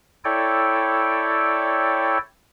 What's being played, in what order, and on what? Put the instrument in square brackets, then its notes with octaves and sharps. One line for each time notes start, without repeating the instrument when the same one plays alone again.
[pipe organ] E4 A4 C#5 D5 G5